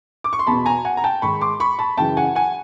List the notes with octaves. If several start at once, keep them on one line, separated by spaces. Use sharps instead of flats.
D6
C#6
C6
E2 B2 A5 B5
G#5 A#5
F#5 G#5
A#5
G5 A5
G#2 D#3 B5 C#6
C6 D6
B5 C#6
A5 B5
F#2 C#3 E3 G5 A5
F#5 G#5
F#5 G#5